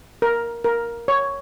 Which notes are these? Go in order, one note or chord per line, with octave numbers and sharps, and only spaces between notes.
A#4
A#4
C#5